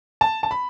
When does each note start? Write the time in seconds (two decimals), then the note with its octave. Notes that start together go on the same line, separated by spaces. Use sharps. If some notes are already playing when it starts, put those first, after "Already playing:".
0.21 A5
0.43 A5
0.51 B5